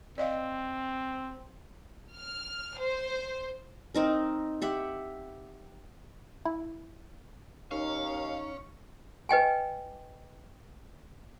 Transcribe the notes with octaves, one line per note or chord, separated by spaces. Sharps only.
C4 D5 D#5 F5
F6
C5
C4 D#4 A#4
G4 E5 F#5
E4
D#2 C#4 D#4 F5
B4 D#5 G5 G#5